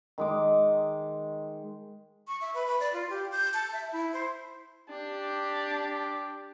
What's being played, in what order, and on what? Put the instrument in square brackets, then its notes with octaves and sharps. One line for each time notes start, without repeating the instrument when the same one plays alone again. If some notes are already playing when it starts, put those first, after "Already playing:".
[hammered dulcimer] D#3 G#3 D6
[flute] C#6
E5
B4
B4
D5
F4
G4
G6
A5
E5
E4
C5
[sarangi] D4 [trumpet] G4